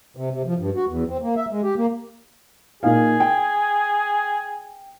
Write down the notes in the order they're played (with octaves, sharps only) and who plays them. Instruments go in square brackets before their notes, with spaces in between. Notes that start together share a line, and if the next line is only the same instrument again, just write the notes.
[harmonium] C3
C3
F3
G2
F#4
E2
C4
A#3
E5
G#3
G4
A#3
[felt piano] A#2 D#4 F5 [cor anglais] G#4
[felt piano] G5